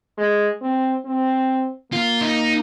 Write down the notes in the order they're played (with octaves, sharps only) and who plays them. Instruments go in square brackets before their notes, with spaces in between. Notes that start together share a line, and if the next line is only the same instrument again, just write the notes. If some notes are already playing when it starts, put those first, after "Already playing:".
[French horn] G#3
C4
C4
[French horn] A#3 [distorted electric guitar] F4
[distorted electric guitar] D#4